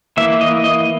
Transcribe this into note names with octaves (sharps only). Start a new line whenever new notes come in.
E3 A#3 E4 E5
D#5
D#5